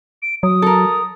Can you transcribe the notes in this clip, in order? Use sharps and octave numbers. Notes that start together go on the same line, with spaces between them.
D7
F#3 D#6
A4 A#4